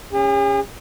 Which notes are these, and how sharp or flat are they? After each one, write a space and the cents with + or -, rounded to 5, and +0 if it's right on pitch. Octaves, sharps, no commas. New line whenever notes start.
C#4 +0 G#4 -45